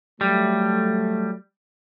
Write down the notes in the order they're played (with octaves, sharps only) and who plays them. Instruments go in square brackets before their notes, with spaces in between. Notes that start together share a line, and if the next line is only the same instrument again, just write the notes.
[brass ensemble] F#3 A3 [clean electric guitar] G3